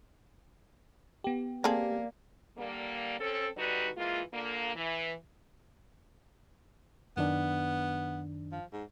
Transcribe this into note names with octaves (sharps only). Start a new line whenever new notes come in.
B3 G4
A#3 C4 G#4 A4 D5 F5
D3 G3 A#3
C4 C#4 A4
D3 G3 D#4 F#4 B4
E3 G#3 A#3 F4
A#2 D3 A#3
E3
F#2 D#3 B3 D4
F3
G#2